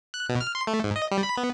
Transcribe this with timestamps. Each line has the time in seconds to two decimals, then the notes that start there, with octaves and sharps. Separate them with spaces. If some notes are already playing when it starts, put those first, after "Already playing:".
0.14 F#6
0.29 B2
0.41 F6
0.55 C6
0.67 A3
0.84 G#2
0.96 D#5
1.11 G3
1.23 B5
1.37 B3